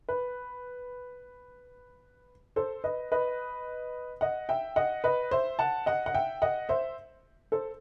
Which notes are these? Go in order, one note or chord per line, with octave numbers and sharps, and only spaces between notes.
B4
A4 C5
B4 D#5
B4 D#5
D#5 F#5
E5 G5
D#5 F#5
B4 D#5
C5 E5
F#5 A5
D#5 F#5
F#5
E5 G5
D#5 F#5
C5 E5
A4 C5